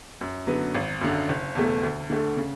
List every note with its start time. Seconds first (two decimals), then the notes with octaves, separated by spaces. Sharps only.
0.21 F#2
0.47 D3 F#3 B3
0.74 G#1
1.01 F#2 D3
1.29 F#1
1.55 E2 B2 A3
1.83 D2
2.10 D3 A3
2.37 C#3